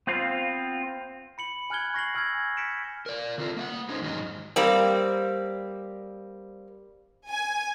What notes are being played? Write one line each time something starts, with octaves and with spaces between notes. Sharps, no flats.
B3 C4 F4 F5
B5 C#7 F#7
G#5 F6 F#6 G#6 G7
C#6 A#6 C7 F#7
G#5 E6 F6 G6 G#6 A#6
B6 C#7 D7 E7
A#4 D5
D3 C4 F4 A4
A#3 E5 F#5
A3 C#4 D#4 C5
E2 G#2 D#3 F#3 D#5
G3 A#3 C4
G#5